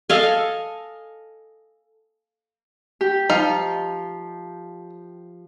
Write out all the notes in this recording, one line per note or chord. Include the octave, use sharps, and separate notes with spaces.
A4 D#5 F5 G#5
G4
F3 D#4 F5